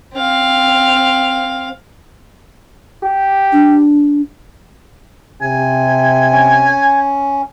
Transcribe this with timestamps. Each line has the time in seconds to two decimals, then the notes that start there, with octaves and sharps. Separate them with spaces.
0.14 C4 F5
3.03 G4
3.52 D4
5.42 C3 G#5
6.32 C#4